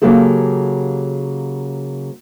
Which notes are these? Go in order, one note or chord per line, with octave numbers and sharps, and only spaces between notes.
C#3 F3 F#3 A#3 G4 A4